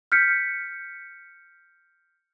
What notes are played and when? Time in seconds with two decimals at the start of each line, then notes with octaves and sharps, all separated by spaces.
0.12 F6 G6 B6 C#7